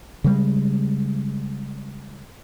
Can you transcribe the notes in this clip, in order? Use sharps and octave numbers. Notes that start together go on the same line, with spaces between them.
C#3 G3 G#3